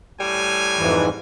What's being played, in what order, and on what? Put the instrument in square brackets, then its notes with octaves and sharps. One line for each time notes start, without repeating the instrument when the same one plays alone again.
[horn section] A2 G3 G#5
[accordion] F2 G#2 E3